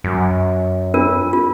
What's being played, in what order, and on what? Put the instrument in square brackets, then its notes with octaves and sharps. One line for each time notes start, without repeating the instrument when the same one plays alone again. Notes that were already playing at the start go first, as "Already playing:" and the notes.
[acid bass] F#2
[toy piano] D4 F4 A#4
F4